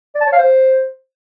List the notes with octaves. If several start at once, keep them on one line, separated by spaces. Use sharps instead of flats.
D5
A5
C#5
F5
C5